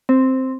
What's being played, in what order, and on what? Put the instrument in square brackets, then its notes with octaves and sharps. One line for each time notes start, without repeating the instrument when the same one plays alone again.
[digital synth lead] C4